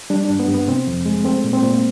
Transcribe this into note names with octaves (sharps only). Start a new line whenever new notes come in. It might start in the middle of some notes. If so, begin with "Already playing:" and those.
G3 D4
D4
G2
B3
G2
B3
C3 C4
F2
G#3
A3 C4
A#2
C4
A#2